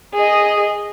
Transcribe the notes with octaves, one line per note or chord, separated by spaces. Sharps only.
G#4 D#5